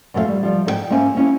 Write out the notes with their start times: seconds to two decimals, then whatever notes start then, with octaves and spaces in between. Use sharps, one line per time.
0.14 F#2 F3 A3 A4 E5 F5
0.28 G3
0.43 F3 G3
0.66 G#2 A4 G5
0.90 A#3 C#4 C5 E5 G#5
1.15 A#3 C#4 E4